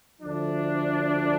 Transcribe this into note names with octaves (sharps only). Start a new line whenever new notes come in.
D2 D3 F3 A3 D4